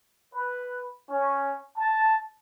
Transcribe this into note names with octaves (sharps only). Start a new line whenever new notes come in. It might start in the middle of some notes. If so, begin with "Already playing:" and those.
B4
C#4
A5